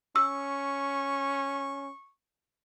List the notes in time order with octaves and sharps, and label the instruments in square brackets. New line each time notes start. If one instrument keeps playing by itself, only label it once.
[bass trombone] C#4 [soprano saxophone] C#6 [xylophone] E6